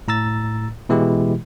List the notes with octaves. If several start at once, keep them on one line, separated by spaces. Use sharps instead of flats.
A2 A#5 E6 A6
B2 E3 G#3 E4 G4